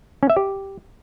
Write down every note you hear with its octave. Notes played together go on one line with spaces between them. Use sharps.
C#4
E5
G4